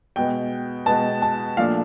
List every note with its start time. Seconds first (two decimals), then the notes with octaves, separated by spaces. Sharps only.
0.16 B2 G#3 B3 G5
0.86 B2 G#3 B3 A5
1.22 A5
1.57 A#2 F3 A3 D4 F5